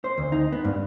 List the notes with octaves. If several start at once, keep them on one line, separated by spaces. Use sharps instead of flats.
C5
D2
D#4
B3
G2